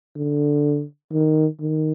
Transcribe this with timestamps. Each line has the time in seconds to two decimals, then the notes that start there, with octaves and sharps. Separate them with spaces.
0.16 D3
1.13 D#3
1.60 D#3